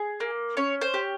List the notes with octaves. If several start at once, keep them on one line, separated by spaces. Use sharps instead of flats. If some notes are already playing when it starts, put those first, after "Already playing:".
Already playing: G#4
A#3
C#4 C#5
C5
G4